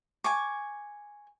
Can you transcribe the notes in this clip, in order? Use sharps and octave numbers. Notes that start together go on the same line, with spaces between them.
G#5 C#6 D6